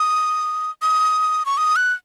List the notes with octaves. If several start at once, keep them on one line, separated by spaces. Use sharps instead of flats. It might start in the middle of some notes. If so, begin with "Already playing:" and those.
Already playing: D#6
D#6
C#6
D#6
F#6